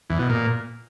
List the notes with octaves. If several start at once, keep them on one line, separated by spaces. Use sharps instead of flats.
E2
B2
A#2